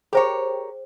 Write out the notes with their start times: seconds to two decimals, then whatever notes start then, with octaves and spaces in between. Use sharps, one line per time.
0.13 G4 G#4 A#4 C5 C#5 G5